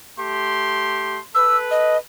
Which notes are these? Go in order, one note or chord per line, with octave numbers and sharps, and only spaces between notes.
A3 G4 C6
A4 B4 E6
D#5